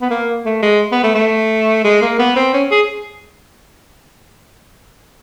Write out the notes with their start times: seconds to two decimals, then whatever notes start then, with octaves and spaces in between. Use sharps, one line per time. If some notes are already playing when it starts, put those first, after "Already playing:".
0.01 B3
0.10 A#3
0.46 A3
0.63 G#3
0.92 B3
1.03 A3
1.15 A3
1.84 G#3
2.02 A#3
2.19 B3
2.36 C4
2.54 C#4
2.71 G#4